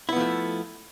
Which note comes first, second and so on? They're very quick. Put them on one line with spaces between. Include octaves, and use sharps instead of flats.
E4 B3 F3 A3